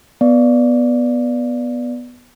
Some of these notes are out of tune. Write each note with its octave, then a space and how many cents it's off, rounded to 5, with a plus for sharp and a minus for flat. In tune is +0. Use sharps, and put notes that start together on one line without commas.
B3 +0 D5 +0